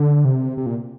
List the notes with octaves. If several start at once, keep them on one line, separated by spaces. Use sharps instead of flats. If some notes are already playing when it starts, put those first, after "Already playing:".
Already playing: D3
C3
C3
A#2